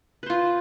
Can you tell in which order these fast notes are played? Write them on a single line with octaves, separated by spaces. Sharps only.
B4 C5 F4